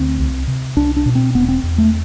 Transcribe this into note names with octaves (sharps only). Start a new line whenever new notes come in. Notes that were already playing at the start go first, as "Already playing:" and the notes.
Already playing: D2 C4
C2
C3
C2 D4
D4
B2
C4
E1 B3
C4
E2
A3